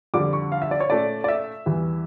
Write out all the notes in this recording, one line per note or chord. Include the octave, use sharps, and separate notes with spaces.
F2 D3 G3 D4 D6
C#6
F5
E5
D5
C#5
A#2 A3 C#4 D5
D5
E5
E2 E3 G3